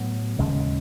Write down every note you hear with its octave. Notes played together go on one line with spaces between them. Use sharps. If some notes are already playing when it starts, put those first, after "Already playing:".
Already playing: A2 F#3 B3
D#2 C#3 G#3